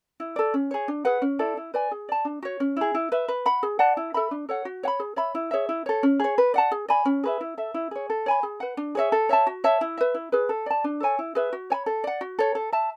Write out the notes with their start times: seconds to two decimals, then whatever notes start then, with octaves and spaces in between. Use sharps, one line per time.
0.20 E4
0.36 A4 D5
0.54 C#4
0.71 G#4 C#5
0.88 D4
1.05 G#4 B4 F#5
1.22 C#4
1.39 E4 A4 D5
1.57 E4
1.74 B4 D5 G#5
1.92 G#4
2.09 D5 A5
2.25 D4
2.43 F#4 C#5
2.60 C#4
2.77 E4 G#4
2.95 E4
3.12 B4 E5
3.28 B4
3.46 F#5 B5
3.63 G#4
3.79 D5 F#5 A5
3.97 E4
4.14 A4 E5 B5
4.31 D4
4.49 A4 C#5 F#5
4.65 F#4
4.83 C#5 F#5
4.88 B5
5.00 G#4
5.16 C#5 E5 B5
5.35 E4
5.51 G#4 C#5 E5
5.69 E4
5.86 A4 C#5
6.03 C#4
6.20 G#4 C#5
6.38 B4
6.54 D5 F#5 A5
6.72 G#4
6.88 D5 G#5 B5
7.05 C#4
7.24 G#4 B4 E5
7.41 E4
7.58 A4 E5
7.74 E4
7.91 G#4 C#5
8.10 A4
8.26 C#5 G#5 B5
8.43 G#4
8.60 B4 F#5
8.77 D4
8.95 G#4 C#5 E5
9.12 A4
9.29 C#5 E5 A5
9.47 F#4
9.64 C#5 E5 A5
9.81 E4
9.97 B4 E5
10.14 E4
10.32 G#4 B4
10.49 A4
10.66 D5 A5
10.84 D4
11.00 A4 C#5 G#5
11.19 E4
11.35 G#4 B4 E5
11.53 F#4
11.70 C#5 G#5 B5
11.86 A4
12.04 D5 F#5
12.21 F#4
12.39 A4 C#5
12.55 A4
12.73 E5 A5